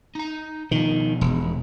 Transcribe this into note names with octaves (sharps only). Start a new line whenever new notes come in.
D#4 A#5
B2 D#3 F3
E1